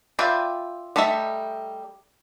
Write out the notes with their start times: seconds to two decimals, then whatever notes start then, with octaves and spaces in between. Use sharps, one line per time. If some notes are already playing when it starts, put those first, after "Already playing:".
0.19 F4 B4 D5 E5 G5
0.96 G3 A3 D#4 A4 E5